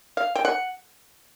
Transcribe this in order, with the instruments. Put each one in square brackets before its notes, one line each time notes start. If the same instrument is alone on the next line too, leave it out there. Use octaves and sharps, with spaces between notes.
[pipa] F5
G5
F#5